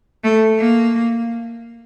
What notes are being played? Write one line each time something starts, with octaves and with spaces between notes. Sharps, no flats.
A3
A#3